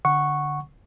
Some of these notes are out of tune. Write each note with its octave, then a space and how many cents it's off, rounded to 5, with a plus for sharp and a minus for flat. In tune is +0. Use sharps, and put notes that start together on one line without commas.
D3 +0 F#5 +0 C#6 -5